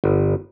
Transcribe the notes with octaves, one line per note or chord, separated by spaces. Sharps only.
G1